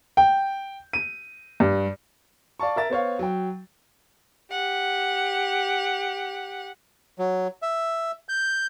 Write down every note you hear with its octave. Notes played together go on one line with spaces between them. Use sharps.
G5
D#7
G2
D5 F5 A5 C#6
A#4 E5 A6
B3 C5 C#5 F5
F#3 G5
G4 F#5
F#3
E5
G6